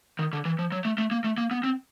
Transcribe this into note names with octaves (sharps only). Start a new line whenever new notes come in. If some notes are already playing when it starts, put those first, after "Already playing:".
D#3
D3
E3
F3
F#3
A3
A3
A#3
A3
A#3
B3
C4